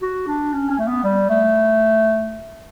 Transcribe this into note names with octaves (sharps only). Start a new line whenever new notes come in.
F#4
D4
C#4
C#4
A3
B3
G3
A3